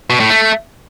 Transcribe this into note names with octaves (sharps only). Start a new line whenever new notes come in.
B2
A2
A3